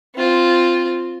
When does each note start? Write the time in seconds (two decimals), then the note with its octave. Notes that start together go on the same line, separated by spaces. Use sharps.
0.15 C4 F4